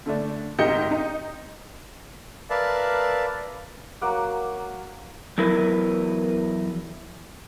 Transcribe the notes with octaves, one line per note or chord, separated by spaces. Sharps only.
D3 A3 D4
G#1 G#2 G4 D#5 G6 C#7
D#4
A#4 B4 D5 E5 F5 A5
F#3 A#3 F#5 D6
E2 F#3 E4 A#4 B4